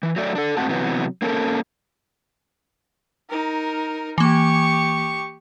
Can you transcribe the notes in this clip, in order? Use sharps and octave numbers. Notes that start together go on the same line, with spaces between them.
E3
F#3 A3 D5
D4 A4
G#2 A3 C4 F#4 F#5 A5
C3 E3 F#3 B3
A#3 C#4 A4 A#4
D#4 A#4
E3 A#3 G4 C#6